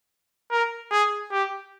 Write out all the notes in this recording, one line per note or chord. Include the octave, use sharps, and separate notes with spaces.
A#4
G#4
G4